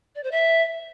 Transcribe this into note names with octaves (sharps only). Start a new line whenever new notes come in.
D5
C5
E5